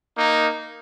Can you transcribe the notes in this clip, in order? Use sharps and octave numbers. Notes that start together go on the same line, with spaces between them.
A#3 D#4